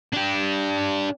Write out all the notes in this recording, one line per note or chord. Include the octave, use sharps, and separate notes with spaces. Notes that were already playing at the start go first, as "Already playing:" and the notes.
D4 G4